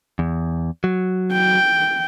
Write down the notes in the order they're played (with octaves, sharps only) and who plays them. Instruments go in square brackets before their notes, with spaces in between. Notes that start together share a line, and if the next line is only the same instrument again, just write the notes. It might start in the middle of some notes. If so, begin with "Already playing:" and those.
[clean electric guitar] E2
F#3
[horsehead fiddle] G5